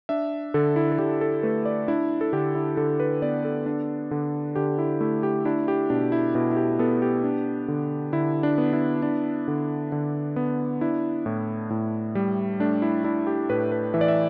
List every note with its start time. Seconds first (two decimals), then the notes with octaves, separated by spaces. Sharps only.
0.09 D4 E5
0.54 D3 A4
0.76 E4
0.92 A4
0.98 D3 G4
1.21 A4
1.43 A3 B4
1.66 D5
1.88 D4 E4
2.21 A4
2.33 D3 G4
2.55 E4
2.77 D3 A4
3.00 B4
3.22 B3 D5
3.45 A4
3.66 D4
4.11 D3
4.55 D3 G4
4.78 E4
5.01 A3 E4
5.23 G4
5.45 D4 E4
5.68 G4
5.90 B2 D4
6.12 E4
6.35 B2 E4
6.51 E4
6.56 G4
6.79 B3 A4
7.02 G4
7.24 D4
7.68 D3
8.13 D3 E4
8.43 D4
8.58 B3
8.73 E4
9.03 D4
9.48 D3
9.92 D3
10.36 B3
10.81 D4 E4
11.26 A2
11.70 A2
12.15 G3
12.60 A3 D4
12.82 E4
13.04 D4 E4
13.27 G4
13.50 A2 B4
13.72 B4
13.94 E3 E5
14.01 D5
14.08 E5